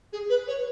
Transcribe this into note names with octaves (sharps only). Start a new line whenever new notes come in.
G#4
B4
C#5